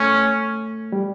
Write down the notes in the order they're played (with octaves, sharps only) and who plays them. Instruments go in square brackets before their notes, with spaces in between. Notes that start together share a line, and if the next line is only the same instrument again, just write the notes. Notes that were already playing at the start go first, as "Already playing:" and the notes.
Already playing: [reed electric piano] A3 [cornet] C#4
[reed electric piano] G3